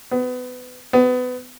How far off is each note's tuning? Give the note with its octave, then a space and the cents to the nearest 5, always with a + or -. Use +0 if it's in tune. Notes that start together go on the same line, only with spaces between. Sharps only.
B3 +30
B3 +30